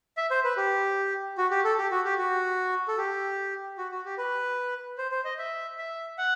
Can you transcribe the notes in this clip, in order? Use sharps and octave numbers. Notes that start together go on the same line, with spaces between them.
E5
C5
B4
G4
F#4
G4
A4
G4
F#4
G4
F#4
A4
G4
F#4
F#4
G4
B4
C5
C5
D#5
E5
E5
F#5